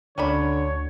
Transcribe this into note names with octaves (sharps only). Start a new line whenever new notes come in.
D2 D3 C#4 D4 C#5 B5